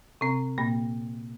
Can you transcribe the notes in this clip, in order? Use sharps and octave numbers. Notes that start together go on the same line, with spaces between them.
C3 C4
A#2 A#3